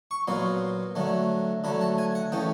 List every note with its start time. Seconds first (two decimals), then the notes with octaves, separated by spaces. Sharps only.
0.11 C#6
0.27 A#2 F#3 B3 C6
0.95 D3 F#3 A3
1.64 D3 F#3 A3 B5
1.81 A5
1.98 G#5
2.15 F#5
2.32 C#3 E3 A3 C#4 G5